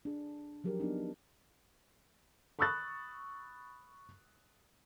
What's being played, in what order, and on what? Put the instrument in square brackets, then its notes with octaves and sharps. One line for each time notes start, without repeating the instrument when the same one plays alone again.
[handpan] D4 G#4
F3 F#3 G4 G#4 A#4
B3 C4 D4 D#4
[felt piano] B5 C#6 D#6 E6 F#6 A6